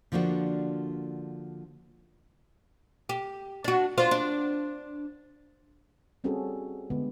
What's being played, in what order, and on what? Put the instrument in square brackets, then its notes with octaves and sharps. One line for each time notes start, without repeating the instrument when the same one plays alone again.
[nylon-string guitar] D3 F3 A#3 D4 F#4
[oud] G4
D4 F#4
D4 F4 C5
D4
[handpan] G3 C4 C#4 F#4 G#4 A4
D3 G#3 B3